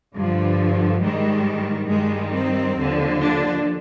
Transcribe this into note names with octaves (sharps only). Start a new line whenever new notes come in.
G2 D3 F3
G#2 D#3 G3 G#3
G2 D#3 G3 G#3
C4
D#2 D3 F3
D4